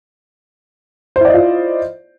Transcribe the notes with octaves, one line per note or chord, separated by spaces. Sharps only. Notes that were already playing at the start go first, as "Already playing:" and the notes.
E4 F4 C5 D5 D#5